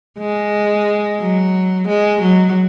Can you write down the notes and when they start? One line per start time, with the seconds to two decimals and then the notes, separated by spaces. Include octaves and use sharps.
0.19 G#3
1.20 F#3
1.87 G#3
2.21 F#3